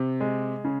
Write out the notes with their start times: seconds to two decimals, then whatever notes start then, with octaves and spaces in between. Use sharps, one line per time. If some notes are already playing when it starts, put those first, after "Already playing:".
Already playing: C3
0.20 G#3
0.64 C#3